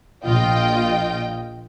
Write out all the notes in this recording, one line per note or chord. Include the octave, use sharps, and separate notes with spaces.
A#1 F4 D#5 G5